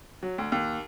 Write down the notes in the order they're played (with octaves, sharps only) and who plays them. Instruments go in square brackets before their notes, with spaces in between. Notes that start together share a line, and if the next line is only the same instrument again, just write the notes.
[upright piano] F#3
D2
D#2